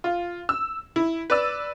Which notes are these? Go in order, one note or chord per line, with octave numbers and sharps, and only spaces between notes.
F4
E6
E4
B4 D5 E6